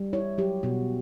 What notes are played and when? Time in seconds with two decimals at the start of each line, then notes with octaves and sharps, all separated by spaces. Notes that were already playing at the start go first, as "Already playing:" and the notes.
Already playing: G3
0.13 E4 C#5
0.38 F#3 G4
0.63 B2 F#4